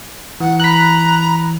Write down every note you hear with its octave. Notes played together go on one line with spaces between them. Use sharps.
E3 F#5
A#5 B5 F#6